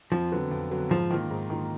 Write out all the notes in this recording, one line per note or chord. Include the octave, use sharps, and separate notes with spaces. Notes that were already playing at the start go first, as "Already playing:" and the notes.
F2 F3
D3 F#3 B3
F2
D3 F#3 B3
G#2 F3
D#3 A#3 F4
G#2
D#3 A#3 F4